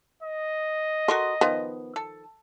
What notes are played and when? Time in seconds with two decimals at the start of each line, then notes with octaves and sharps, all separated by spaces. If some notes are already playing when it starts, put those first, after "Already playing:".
0.22 D#5
1.08 F#4 A4 A#4 C6
1.41 D#3 F3 B3
1.96 A4